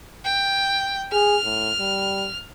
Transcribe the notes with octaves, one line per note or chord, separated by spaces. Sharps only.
G5
G#4 F6
A2
G3